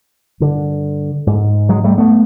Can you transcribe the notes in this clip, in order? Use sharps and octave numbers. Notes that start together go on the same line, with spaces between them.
G2 D3
G#2
F#3 G#3
G3 A3
A3 B3